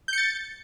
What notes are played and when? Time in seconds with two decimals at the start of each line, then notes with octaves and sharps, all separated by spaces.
0.08 G6
0.13 C#7
0.18 A6